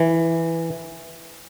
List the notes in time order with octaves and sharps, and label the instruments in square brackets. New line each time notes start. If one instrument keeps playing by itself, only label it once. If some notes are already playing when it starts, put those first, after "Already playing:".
Already playing: [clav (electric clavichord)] E3